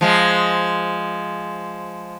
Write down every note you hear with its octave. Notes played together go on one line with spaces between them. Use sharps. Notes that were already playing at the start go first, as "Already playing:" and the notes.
F3 G#3